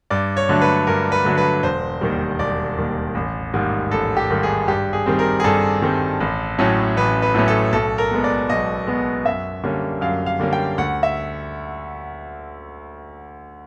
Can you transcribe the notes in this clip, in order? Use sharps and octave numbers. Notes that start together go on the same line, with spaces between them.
G2 D5
C#5
D3 F#3 A3 D4
B4
G2 A#4
B4
D3 F#3 A3 D4
B4
E1 C5
D#2 D#3 G3
E1 D5
D#2 D#3 G3
A1
G#2 D#3 G3 A#3
A1 A4
G4
G#2 D#3 G3 A#3
G#4
G2 G4
G#4
D#3 G3 C4
A#4
G#4
G2 A4
D#3 G3 C4
A1
A2 F#3 A3 C#4
A1 B4
B4
A2 F#3 A3 C#4
A4
B1 A4
A#4
B2 G#3 B3
D5
B1 D#5
B2 G#3 B3
F#2 E5
D3 G3 A#3 C#4
F#2 F5
F5
D3 G3 A#3 C#4
G5
D2 F#5
E5